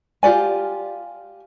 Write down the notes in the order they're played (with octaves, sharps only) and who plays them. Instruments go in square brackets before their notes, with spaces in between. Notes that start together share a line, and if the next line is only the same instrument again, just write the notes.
[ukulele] F4 G4 D5 G#5